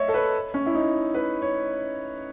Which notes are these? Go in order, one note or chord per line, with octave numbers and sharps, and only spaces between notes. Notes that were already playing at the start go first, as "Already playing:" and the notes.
Already playing: C#5 D#5 E5
A4
B4
C#4
E4
D#4
B4
C#5